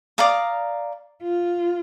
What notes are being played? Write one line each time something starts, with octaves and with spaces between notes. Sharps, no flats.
D5 F5 A#5 D#6
F4